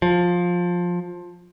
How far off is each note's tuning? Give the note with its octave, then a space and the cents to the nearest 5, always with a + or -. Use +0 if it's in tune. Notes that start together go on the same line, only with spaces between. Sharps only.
F3 +15